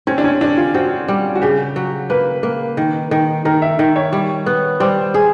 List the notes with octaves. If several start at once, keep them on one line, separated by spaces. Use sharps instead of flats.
C4 C#4
D4
C#4
C4 D4
F4
C4 F#4
G3
F#4
C#3 G4
F#3
A#3 B4
A#3
D#3
D#3
D#3 A#4
E5
D#3
C#5
G3
B3
G3 C5
G#4